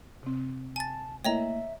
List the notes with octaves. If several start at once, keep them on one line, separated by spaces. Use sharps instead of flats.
C3 C4
G#5 A5 A6
A3 A#3 E4 C#5 D#5 E5 G5 A#5